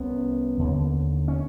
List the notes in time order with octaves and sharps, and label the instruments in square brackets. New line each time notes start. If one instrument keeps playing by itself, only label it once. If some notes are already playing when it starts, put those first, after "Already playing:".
Already playing: [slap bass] C2 C3 B3 C#4
D#2 D3
C#4